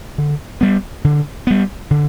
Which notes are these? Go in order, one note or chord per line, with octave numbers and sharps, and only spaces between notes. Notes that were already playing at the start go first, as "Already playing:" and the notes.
D3
G3 B3
D3
G3 B3
D3